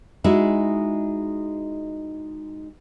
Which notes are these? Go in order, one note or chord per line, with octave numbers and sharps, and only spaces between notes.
G#3 D#4 E4 F#4 G#4